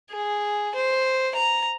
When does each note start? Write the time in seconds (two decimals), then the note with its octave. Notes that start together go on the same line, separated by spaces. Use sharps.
0.11 G#4
0.75 C5
1.35 A#5